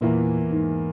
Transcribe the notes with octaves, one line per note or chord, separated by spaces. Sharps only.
E2 A#2 E3 A#3 E4
G#2